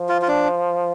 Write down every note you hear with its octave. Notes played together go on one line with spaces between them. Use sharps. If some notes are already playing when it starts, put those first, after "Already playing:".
Already playing: F3
F4
F4
D4